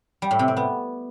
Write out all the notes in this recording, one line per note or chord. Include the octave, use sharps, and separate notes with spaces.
G3
A2
C3
C4
B3